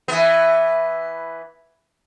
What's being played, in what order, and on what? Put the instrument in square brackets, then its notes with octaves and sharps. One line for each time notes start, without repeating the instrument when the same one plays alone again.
[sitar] E3 B3